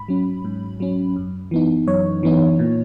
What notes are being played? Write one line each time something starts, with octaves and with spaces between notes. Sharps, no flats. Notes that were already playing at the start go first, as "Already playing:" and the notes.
Already playing: G#2 B5
F#3 C#4
G#2
F#3 C#4
F#2
E3 B3 D#4
F#2 C#5
E3 B3 D#4
A#2